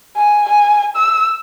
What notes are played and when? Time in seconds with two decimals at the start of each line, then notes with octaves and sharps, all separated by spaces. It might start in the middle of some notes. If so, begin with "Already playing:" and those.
0.17 G#5
0.48 G#5
0.96 E6